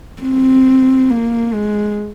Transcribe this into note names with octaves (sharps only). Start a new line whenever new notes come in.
C4
A#3
G#3